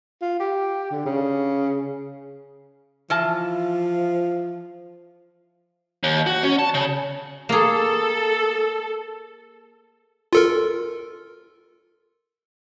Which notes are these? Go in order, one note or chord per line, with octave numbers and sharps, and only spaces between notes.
F4
G4
D3
C#3
E3 F3 F4 A5
D#2
F#4
C#4
A5
C#3
A#3 G#4 A4
F4 A4 A#4